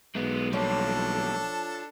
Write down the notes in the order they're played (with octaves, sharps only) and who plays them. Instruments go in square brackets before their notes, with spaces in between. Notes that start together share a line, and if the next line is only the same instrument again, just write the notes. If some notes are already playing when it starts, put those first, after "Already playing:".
[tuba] B1 [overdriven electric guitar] G#3 B3
[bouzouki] F3 C#5 [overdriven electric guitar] G3 A#3 [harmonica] D4 A4